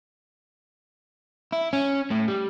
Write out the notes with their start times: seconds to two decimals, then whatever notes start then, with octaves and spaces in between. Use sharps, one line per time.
1.53 E4
1.73 C#4
2.10 A2
2.28 G3